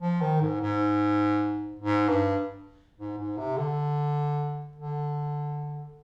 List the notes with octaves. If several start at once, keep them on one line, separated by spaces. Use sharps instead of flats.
F3
D#3
G#2
G#2
G#2
G2
G#2
G#2
C3
D3
D3